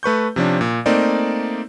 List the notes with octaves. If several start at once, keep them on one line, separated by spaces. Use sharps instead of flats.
A3 B4 C#6 G6
C3 F3 C#4 D4
A#2
A3 A#3 C4 D#4 D5